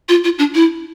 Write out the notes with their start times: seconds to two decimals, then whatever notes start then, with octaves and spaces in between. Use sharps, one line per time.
0.09 F4
0.24 F4
0.39 D4
0.55 E4